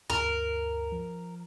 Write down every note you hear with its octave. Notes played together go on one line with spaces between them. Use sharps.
D2 G2 A#4
F3